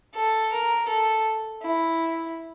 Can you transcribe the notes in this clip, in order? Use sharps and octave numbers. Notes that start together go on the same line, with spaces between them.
A4
A#4
A4
E4